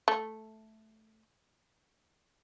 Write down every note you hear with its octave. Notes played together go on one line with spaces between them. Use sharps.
A3